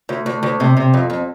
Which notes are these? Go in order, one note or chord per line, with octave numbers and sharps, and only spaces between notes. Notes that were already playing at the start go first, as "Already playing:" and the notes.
D2
D2
D2
C3
C3
F2
F2